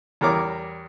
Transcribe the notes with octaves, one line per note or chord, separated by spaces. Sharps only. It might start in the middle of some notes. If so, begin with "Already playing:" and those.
E2 G3 A#4 C#5 D6